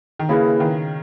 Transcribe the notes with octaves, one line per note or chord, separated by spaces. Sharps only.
D#3
C#3 A#3 E4 G#4 B4
D#3